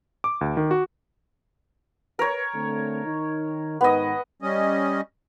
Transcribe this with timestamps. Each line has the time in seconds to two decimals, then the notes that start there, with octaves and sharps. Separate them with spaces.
0.24 D6
0.41 D2
0.57 D#3
0.71 F#4
2.19 A#4 B4 C#5
2.55 D3 A3 C4
3.05 D#3 D#4
3.81 G#2 D#3 B3 D#5
4.42 G3 C#4 D#5